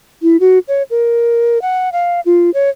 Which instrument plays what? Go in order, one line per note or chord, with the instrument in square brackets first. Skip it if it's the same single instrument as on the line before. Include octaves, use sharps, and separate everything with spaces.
[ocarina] E4
F#4
C#5
A#4
F#5
F5
F4
C#5